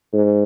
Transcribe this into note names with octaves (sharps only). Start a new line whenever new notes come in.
G#2